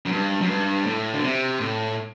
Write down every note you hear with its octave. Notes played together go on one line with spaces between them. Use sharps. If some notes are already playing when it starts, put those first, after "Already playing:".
F#2
G2
F#2
G2
A2
D3
C3
A2